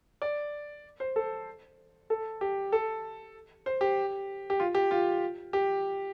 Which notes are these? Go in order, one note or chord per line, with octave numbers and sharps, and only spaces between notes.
D5
C5
A4
A4
G4
A4
C5
G4
G4
F4
G4
F4
G4